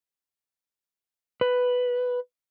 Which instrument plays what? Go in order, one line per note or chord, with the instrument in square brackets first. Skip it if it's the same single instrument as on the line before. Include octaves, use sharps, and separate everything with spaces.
[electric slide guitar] B4